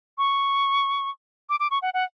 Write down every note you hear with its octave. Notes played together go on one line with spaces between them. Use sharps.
C#6
D6
D6
C#6
F#5
F#5